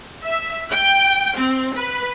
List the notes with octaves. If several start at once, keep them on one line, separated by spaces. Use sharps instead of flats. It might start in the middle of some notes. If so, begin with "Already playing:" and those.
E5
G5
C4
B4